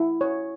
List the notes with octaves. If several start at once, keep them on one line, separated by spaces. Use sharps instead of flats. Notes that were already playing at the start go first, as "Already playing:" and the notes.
Already playing: E4
C#5